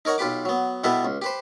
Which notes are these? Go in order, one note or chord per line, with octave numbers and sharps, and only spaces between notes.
D#4 A#4 C#5 F#5 A#5
B1 F4 G4 B4 D6
F#3 B3
B2 G3 B3 E4 A4 B4
C#2
G4 B4 C5